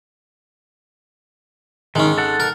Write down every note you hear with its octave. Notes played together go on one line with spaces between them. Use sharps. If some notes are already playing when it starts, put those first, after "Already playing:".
G#1 D#3 G#3 C#4
A4 F#5
A#4